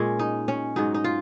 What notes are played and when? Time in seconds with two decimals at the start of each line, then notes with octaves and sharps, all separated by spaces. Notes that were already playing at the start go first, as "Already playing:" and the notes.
Already playing: A#2 G#3 C#4
0.19 D#4
0.48 C#4
0.76 G#2 F#3 D#4
0.94 D#4
1.04 F4